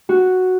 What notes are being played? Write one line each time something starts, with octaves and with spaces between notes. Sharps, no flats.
F#4